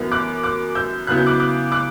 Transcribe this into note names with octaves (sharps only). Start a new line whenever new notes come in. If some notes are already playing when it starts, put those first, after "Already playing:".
Already playing: F#2 E3 B3 E4
D6 F#6
D6 F#6
E6 G6
C#3 F#3 B3 E4 F#6
G6
D6 F#6
D6 F#6
D6 F#6